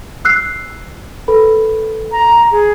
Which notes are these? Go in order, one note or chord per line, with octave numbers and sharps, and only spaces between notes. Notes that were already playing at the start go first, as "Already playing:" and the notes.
E6 F#6 C7
A4 B4 B5
A#5
G#4